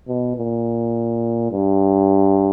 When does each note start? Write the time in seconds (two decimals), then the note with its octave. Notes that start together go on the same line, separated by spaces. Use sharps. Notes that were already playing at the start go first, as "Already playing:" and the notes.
0.08 B2
0.37 A#2
1.52 G2